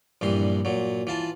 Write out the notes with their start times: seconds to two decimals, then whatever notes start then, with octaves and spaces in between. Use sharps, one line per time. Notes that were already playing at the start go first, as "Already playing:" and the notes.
0.21 A#1 G2 E3 C6
0.65 A#2 F#3
1.07 E3 F4 A5